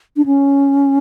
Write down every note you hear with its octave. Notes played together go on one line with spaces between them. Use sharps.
D4
C#4